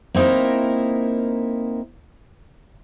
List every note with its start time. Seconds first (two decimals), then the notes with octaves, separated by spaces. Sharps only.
0.14 A#3 C4 D#4 E4 A#4